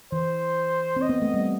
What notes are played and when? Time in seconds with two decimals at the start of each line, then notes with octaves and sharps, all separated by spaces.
0.12 E3 C5
0.96 C4
1.02 D#5
1.09 B3
1.22 A3
1.34 G3